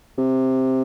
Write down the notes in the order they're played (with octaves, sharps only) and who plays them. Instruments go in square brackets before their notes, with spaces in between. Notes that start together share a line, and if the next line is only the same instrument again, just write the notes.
[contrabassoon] C3